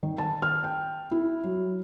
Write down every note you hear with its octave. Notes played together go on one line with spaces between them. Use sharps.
D#3
A5
F6
G5
E4
F#3